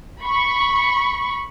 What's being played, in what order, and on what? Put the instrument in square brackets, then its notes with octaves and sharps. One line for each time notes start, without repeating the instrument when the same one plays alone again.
[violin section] B5 C#6